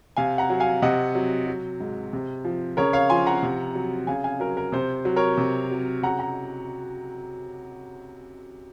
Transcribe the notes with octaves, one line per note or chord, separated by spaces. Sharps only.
C3 F5 G#5
F#5 A#5
F#3
F5 G#5
C3 D#5 F#5
F#3
F#3
G#2
C3
F3
C#3 A#4 C#5
C#5 F5
F3 G#5 C6
F#5 A#5
C3
F#3
C#3 F5 G#5
F5 G#5
F#3 A#4
A#4
C3 C5
F#3
A#4 C#5
C3
F#3
C#3 F#5 A#5
F#5 A#5